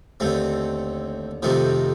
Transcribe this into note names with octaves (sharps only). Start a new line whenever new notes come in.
D#2 D3 A3 C4
F2 C3 D#3 F3 A3